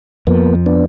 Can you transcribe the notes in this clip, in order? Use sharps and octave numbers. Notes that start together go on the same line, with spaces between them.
F2 F3 A#3 B3
B3 D4